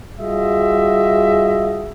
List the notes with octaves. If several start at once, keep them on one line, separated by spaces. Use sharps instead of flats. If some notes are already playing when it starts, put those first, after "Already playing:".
G3 F4 F#4 G#4 D#5 E5